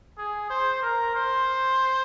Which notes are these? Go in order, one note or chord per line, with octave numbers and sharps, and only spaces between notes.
G#4
C5
A#4
C5